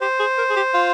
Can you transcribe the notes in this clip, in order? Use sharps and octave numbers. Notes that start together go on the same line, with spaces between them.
G4 C5
G#4
A#4
G#4
G4
F4